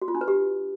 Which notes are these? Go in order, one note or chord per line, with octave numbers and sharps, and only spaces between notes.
F#4
F4
D4
B4
G4